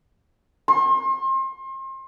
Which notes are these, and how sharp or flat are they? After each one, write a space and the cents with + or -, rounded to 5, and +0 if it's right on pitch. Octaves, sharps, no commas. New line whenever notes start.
C6 +35